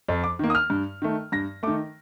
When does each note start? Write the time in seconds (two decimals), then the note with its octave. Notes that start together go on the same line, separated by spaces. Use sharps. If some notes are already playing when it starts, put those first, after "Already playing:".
0.09 F2
0.24 D6
0.39 D#3 A#3
0.50 D#6
0.55 F6
0.70 G2
1.02 D#3 A3
1.32 G2 A#6
1.63 D#3 A3 D6